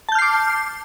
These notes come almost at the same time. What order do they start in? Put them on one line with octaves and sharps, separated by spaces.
A5 G6 F6 C7 D6